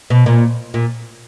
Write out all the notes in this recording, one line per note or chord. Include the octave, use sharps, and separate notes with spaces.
B2
A#2
A#2